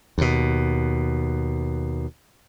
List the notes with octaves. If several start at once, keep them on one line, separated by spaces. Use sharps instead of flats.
D#2 B2